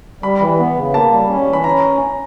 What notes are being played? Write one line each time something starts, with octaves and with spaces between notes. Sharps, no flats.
G3 B5
E3
B3
C#3
A#3 A5
G3
C#4
E3
B5
C#4 A#5